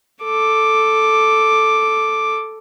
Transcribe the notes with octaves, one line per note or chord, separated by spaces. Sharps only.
A4 D6